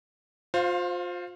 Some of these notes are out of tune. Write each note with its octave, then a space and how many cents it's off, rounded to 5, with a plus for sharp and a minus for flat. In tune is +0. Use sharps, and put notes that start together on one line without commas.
F4 +30 C5 +0 F5 +0